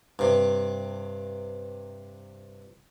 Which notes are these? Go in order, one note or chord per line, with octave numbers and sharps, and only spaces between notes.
G2 C3